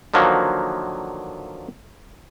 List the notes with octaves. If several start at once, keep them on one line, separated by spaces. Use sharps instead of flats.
D3 D#3 F3 F#3 A#3